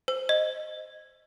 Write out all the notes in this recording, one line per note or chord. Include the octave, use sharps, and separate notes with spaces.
C5
D#5